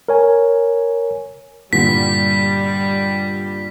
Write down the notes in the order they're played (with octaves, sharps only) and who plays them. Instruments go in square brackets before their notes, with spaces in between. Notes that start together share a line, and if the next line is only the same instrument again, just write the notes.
[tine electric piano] A#4 C#5 G#5
[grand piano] G2 A#2 D3 [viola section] G3 [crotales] B6